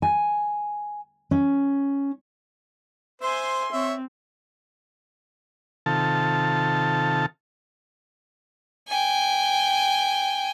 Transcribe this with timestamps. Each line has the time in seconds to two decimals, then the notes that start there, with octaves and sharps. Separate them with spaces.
0.02 G#5
1.31 C#4
3.22 C5 E5 G#5 C6
3.72 C4 C#5 E5
5.86 C3 D#3 F4 A4 A5
8.88 G5 G#5